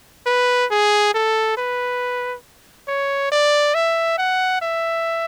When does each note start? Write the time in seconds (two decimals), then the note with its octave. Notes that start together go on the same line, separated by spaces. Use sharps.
0.26 B4
0.71 G#4
1.14 A4
1.57 B4
2.88 C#5
3.32 D5
3.75 E5
4.18 F#5
4.62 E5